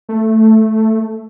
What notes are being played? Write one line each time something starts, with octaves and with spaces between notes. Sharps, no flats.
A3